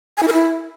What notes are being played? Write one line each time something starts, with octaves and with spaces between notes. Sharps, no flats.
G#5
E4
A#4
E4